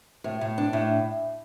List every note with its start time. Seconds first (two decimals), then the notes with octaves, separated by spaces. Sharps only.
0.24 A2
0.41 A2
0.58 D4
0.73 A2